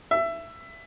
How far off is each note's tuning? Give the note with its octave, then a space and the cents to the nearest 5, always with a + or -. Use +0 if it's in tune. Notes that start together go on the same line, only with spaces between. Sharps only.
E5 +20